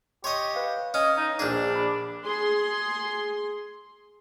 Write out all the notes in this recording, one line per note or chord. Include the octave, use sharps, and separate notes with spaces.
G4 C#5 D#5 C6 C#6
B4 F5
C#4 D#5
D#4
A#1 D4 G#4
B5 D6
G#4 C6